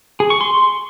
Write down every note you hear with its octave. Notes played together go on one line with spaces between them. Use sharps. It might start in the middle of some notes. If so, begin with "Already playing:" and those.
G#4
C#6
C6